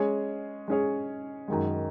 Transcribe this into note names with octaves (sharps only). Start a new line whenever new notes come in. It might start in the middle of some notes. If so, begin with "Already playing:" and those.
Already playing: G#3 C#4 G#4 C#5
G#3 C#4 G#4 C#5
F#2 D#3 G#3